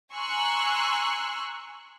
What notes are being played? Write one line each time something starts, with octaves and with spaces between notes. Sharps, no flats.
G#5 A#5 C6 C#6 E6 F#6